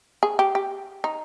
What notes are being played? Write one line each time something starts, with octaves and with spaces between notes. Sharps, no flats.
G#4
G4
G4
D#4